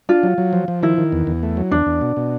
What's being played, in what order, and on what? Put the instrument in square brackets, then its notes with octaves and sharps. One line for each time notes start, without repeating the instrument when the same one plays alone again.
[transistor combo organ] D4 [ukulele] F4
[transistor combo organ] F#3
F#3
F3
F3
[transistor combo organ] D#3 [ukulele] E4
[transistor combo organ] D#3
E2
E2
A3
F#3
[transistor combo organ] E2 [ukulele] D4
[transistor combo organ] E2
B2
B2